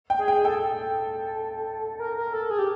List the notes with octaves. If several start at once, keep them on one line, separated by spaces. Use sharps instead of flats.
G5
G#4
G5
A4 G5
A#4
A#4
A4
G#4
G4